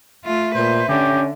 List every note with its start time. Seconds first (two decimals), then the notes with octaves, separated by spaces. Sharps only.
0.25 A3 F4 E5
0.55 A#2 B4 C5
0.89 D3 C#4 G4